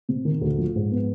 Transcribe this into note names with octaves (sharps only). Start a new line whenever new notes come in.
C3
D#3
D2
F3
G#2
B3